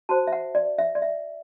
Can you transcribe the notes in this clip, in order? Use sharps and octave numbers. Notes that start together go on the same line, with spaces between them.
F#4 C5 A5
E5
F#5
D5
E5
D5
E5